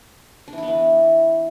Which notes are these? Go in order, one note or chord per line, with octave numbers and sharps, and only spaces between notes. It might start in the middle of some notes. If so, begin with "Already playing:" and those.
D4
E3
E4
B3
E3